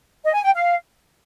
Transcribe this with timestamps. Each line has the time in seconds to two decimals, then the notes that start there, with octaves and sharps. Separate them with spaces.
0.24 D#5
0.34 G#5
0.44 G5
0.54 F5